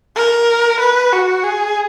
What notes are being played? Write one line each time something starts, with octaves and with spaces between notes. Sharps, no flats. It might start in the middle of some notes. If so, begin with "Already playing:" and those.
A#4
B4
F#4
G#4